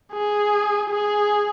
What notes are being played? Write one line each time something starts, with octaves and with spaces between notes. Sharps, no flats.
G#4
G#4